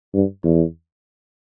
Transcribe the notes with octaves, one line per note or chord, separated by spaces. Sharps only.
G2
E2